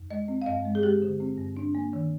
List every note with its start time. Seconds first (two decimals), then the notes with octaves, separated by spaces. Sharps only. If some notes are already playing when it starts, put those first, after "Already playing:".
Already playing: F2
0.11 G#3 D#5
0.28 C4
0.42 F5
0.46 G2 D#5
0.65 G#3
0.75 G#4
0.83 G#3 G4
1.02 D3
1.20 C4
1.38 G2
1.57 D4
1.75 A#3
1.93 D#3